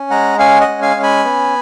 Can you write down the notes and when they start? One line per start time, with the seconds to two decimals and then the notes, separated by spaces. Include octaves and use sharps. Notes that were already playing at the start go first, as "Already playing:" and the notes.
Already playing: C#4
0.10 G#3 F#5 A#5
0.39 C#4 F5 G#5
0.61 D#5 F#5
0.68 G#3
0.82 F5 G#5
0.96 C#4
1.03 G#5 B5
1.24 B3